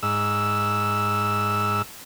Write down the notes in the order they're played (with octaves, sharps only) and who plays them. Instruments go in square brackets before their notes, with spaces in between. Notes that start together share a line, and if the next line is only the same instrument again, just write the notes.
[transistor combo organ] G#2 E6